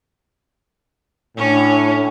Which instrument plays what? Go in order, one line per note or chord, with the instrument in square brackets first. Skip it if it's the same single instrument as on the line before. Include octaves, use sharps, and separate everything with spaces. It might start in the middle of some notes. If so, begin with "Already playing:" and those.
[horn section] A2 [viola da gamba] C#4 D4